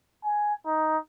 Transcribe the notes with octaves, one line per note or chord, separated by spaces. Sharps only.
G#5
D#4